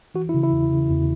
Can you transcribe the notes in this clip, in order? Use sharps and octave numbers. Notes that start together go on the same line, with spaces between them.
E3 F#4
E4
C#3
E4
E2
C#3
E2